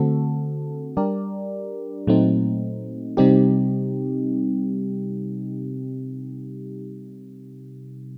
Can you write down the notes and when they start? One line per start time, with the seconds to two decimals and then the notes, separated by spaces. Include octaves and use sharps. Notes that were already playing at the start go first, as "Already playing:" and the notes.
Already playing: D3 A3 C4 F#4 A4
0.97 G3 D4 G4 A#4 D5
2.07 A#2 F#3 A3 C4 D#4
3.17 C3 G3 C4 D#4 G4